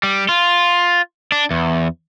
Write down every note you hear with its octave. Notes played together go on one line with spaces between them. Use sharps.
G3
F4
D4
E2